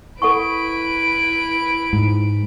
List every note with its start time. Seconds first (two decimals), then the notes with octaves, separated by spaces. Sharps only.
0.22 E4 A4 B4 F#5 C#6 D7
1.93 G#2